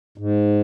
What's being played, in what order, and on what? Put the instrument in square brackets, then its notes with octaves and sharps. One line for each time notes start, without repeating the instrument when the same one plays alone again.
[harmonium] G#2